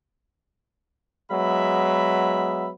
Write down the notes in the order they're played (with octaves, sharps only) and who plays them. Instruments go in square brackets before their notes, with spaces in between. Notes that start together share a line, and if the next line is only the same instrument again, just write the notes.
[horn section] F#3 G#3 B3 E5 B5